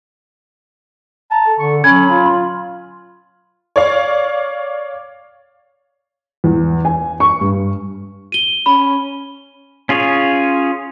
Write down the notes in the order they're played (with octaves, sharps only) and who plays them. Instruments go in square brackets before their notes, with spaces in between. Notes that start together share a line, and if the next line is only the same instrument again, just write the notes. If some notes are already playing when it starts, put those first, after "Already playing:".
[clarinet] A5 [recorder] A#5
[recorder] A4
[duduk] D3 [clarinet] C#6
[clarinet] F#3 [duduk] C#4 [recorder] B5 [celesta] G#6
[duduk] F4
[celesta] C6
[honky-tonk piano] C#5 D5 F5
[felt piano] E2
G#5
C#6
G2
[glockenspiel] D#7 G7
[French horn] C#4 [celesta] B5
[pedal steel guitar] C#4 F4 G#4 C#5